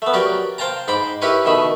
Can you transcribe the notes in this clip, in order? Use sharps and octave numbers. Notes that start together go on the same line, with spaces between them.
A3 B3
F#3 G4 A#4 D5
C5 F5 G5 A5 A#5
G#2 C5 B5 D6
E4 G4 A#4 B4 C#5
B2 D#3 A3 B5